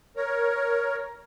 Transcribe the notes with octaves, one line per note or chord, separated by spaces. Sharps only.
A#4 C#5 A#5